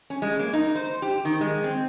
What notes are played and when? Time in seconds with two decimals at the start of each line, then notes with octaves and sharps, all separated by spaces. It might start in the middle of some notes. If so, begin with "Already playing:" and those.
0.10 C#4
0.22 G#3
0.40 A#3
0.53 D#4
0.75 C5
1.02 G4
1.25 D#3
1.41 G#3
1.64 C4